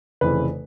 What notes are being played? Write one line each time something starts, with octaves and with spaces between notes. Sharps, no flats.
F1 F2 C#3 E3 B4